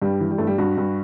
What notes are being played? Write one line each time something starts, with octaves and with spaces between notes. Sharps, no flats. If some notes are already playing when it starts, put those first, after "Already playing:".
G2 G3
E3
G3
G2 A3
G3
G2 F#4
G2